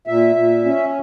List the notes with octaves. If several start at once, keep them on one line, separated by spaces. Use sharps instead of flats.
A#2 E5
A#2
C#4